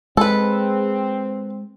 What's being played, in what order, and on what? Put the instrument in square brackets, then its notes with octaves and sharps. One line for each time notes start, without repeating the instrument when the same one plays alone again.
[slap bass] G#3 [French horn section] C4 [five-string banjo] A4 B4